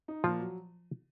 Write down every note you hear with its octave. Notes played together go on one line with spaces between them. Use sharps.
D#4
A#2 F3 F4
F#3